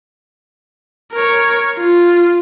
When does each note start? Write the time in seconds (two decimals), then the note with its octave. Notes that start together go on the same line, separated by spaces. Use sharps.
1.12 A#4 C#5
1.77 F4